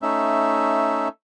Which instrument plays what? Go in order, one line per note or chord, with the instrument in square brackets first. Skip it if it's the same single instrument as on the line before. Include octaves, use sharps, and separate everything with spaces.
[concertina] A3 C#4 D#4 E5